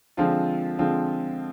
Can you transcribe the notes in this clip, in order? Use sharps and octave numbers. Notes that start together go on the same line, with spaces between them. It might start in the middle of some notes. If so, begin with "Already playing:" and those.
D3 F3 G#3 C4 F4
D3 F3 G#3 C4 F4